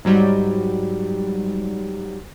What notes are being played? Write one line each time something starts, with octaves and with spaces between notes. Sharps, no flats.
G#2 F#3 G3